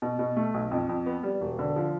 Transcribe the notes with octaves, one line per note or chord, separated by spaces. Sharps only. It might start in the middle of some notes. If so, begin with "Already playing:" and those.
B2
B2
A3
B1
F2
F2
B3
G3
E1
D3
F3